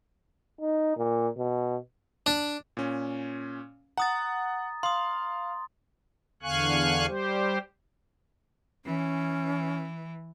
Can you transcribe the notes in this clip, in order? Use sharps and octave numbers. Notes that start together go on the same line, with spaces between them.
D#4
A#2
B2
D4
A#2 C#4
F#5 A#5 D#6 A6
F5 C6 D#6
E2 D3 F5 G#5 C#6 F#6
G3 G4 C5
E3 C#4